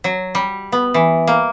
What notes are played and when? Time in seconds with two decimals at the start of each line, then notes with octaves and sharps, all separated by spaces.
0.04 F#3
0.35 G3
0.72 B3
0.94 E3
1.27 A#3